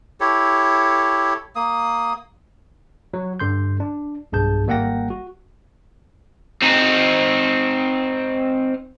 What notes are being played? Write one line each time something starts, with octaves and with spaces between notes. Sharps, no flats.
E4 G4 A4 C#5
A#3 D#6
F#3
G2 D3 C6 G6
D4
B1 G2 G#4 A5 G6
G#1 G3 A#3 F#5 G5 A#6
F#4
C4 D#4